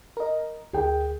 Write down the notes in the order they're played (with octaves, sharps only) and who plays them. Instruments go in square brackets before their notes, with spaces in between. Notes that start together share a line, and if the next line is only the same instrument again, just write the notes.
[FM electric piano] A#4 D#5
[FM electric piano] D2 [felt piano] G#4 A#4 G5